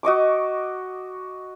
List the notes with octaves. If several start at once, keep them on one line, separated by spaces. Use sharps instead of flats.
F#4 D#5 C#6 D6